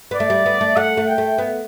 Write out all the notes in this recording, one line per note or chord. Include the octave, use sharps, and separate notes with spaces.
B3 D5
A3
G3
B3
A3
A3 F#5
A3
G5
A3
B3